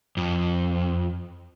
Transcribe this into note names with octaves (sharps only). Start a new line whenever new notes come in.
F2